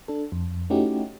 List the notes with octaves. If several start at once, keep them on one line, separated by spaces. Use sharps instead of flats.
D4 A4
F2
A3 C#4 D#4 E4 F#4 G4